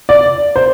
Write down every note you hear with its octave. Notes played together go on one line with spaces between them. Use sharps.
D5
C5